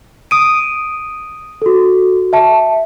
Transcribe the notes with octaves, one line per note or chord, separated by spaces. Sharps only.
D#6 D7 D#7
F#4 A4
E5 A5